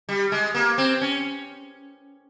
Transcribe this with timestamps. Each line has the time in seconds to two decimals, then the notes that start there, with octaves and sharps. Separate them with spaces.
0.09 G3
0.32 G#3
0.54 A#3
0.78 C4
1.01 C#4